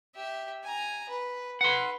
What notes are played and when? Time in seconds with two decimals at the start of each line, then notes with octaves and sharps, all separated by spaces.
0.16 G4 E5
0.64 G#5 A#5
1.09 B4
1.61 B4 F#5 C6